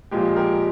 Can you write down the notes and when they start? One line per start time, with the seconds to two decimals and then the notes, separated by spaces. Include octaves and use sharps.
0.11 A#2 F3 G#3 G4
0.36 G4 A#4